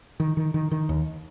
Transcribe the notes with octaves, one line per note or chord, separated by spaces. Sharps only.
D#3
D#3
D#3
D#3
D#2